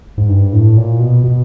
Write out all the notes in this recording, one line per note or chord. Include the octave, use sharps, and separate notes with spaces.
G#2
G2
A2
A#2
B2
B2